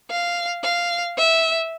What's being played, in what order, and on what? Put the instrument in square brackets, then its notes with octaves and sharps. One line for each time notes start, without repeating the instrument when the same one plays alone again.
[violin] F5
F5
E5